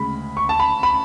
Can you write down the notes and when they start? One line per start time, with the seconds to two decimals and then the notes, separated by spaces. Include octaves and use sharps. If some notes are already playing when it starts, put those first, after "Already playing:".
Already playing: D2 C#3 G#3 B5
0.37 C#6
0.49 A5
0.60 B5
0.83 B5